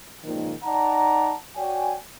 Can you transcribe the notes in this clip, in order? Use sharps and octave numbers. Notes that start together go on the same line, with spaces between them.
C#2 A#2 D#3 F3
D#4 D5 F#5 A5 A#5
F#4 C#5 D5 G5 G#5